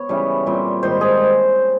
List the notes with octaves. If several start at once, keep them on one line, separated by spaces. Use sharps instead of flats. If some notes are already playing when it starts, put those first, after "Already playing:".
Already playing: B3 C#5
C#3 E3 G3
A#2 G3 C4
G#2 D#3 G3 C5
G#4